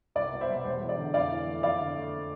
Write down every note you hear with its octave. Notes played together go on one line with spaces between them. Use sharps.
C2 D5
B2
C5 E5
G3
E1 C5
E2
D5
D3
F2 D5 F5
E3
A3
F2 D5 F5
D3
A3